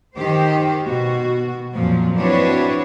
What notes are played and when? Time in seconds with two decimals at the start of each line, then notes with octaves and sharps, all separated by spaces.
0.15 D#3 G4 C5
0.84 B2 F#4
1.74 F2 A#2 F3 F#3
2.18 C4 D4 E4 F#4 B4 C#5